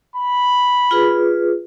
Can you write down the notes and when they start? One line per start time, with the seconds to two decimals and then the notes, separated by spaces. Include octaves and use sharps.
0.16 B5
0.91 F4 G#4 B4